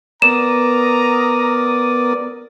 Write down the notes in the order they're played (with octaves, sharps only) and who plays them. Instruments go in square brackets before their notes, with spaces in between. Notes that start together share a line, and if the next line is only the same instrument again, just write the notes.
[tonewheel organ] B3 A#4 D#6 [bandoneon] D5 [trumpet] A#5 [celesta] E7